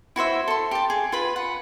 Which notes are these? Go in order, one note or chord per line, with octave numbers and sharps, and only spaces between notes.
E4 F#4 C5 E5
A4 C6
G4 A5
G#4
F4 B4 B5
F#5